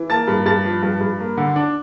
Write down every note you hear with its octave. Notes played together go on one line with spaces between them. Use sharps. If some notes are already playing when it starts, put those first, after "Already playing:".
Already playing: E3
A#3 A5 A6
G2
G2 A5 A6
F3
G2
G2
A#3
D3
D4